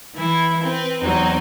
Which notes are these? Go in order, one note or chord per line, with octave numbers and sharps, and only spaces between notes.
E3 E4
C4 B4
E2 F#3 C4 D#4